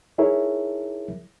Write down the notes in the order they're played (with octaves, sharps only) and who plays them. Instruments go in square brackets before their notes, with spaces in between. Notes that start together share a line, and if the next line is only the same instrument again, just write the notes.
[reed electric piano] D#4 E4 G#4 A#4 C#5 E5